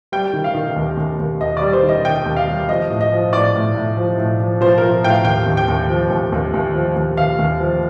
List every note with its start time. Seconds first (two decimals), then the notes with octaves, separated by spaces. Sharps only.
0.12 G3 G5
0.33 D#3
0.44 F5
0.55 D#3
0.76 D#2
0.97 D#2
1.20 D#2
1.40 D#2 D#5
1.57 G3 D5
1.73 C5
1.83 D#3
1.89 D#5
2.05 D#3 G5
2.26 D#2
2.37 F5
2.48 G3
2.68 F3 D#5
2.90 A2
3.01 D#5
3.12 F3
3.33 A2 D5
3.55 A2
3.75 A2
3.97 F3
4.18 A2
4.40 F3
4.61 F3 C5
4.78 F3 A#4
5.04 A2 G5
5.10 F5
5.25 D#2 G5
5.46 D#2
5.57 G5
5.68 D#2
5.90 F3
6.10 D#2
6.32 D#2
6.54 D#2
6.74 F3
6.96 D#2
7.17 D#2 F5
7.39 D#2
7.60 F3